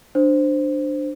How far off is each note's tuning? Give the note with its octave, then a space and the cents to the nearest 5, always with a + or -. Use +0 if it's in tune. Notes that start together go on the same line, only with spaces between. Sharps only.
D4 +15 C5 -5